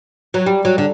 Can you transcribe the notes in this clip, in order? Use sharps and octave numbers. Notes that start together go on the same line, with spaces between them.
F#3
G3
F#3
D3